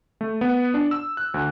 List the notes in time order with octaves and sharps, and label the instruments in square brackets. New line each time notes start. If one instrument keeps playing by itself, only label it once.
[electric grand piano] A3
B3
D4
E6
F#6
D2